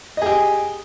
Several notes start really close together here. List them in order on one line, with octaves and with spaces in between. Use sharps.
D#5 G#4 G4